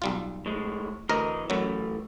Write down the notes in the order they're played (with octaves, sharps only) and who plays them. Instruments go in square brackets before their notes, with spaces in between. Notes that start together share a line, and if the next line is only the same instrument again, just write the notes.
[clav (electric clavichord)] B1 G3 F4
[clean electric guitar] A2 G#3
[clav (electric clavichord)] D2 A#4 A#5 [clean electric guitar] E3 D#5
[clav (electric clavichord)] F#2 F#3 [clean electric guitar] E3 A3